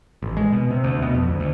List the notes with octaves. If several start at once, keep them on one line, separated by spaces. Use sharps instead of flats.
A1
G#3
B2
C3
D2
B2
F2
D2
D2